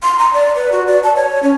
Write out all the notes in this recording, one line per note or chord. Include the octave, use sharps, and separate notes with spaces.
C6
A#5
D5
B4
F#4
D5
A5
C#5
C#4